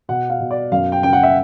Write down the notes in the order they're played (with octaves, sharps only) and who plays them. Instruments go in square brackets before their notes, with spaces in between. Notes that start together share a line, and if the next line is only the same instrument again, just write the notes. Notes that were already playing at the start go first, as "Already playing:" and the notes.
[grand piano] B2 F#5
F5
B2
D5
F#2 F5
G5
C#3 G5
F#5
E5